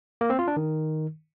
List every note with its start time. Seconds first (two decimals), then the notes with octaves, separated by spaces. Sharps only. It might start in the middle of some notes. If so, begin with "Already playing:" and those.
0.21 A#3
0.30 C4
0.39 F4
0.48 D4
0.57 D#3